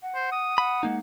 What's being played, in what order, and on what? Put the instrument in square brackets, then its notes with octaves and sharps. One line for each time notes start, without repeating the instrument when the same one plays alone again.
[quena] F#5
[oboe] C5
D#6
[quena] F#5 [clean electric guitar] B5
[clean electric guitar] G#3 A#3 D#4